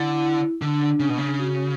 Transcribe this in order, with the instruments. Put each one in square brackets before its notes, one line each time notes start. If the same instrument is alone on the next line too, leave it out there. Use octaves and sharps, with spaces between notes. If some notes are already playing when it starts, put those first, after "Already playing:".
Already playing: [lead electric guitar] D3 [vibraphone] E4
[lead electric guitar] D3 [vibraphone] D4
[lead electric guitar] C#3
B2
C#3
[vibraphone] F#4